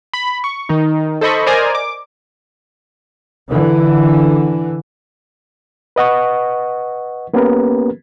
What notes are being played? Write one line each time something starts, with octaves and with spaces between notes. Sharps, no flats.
B5
C#6
D#3 D#4
A4 C5 D#5 B5 C#6
A#4 C5 D5 D#5 G#5 A#5
D6
D3 E3
B4 D#5 F#5 C#6
A#3 B3 C#4 G4 A#4 B4